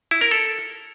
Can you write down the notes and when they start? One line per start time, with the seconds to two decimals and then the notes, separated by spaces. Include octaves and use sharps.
0.11 E4
0.21 A#4
0.31 A4